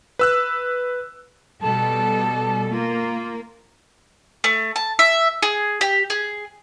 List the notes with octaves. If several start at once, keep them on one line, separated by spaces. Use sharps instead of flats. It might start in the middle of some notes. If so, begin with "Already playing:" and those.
B4 E6 F#6
B2 G3 A4 A5
A#3 F4
A3
A5
E5
G#4
G4
G#4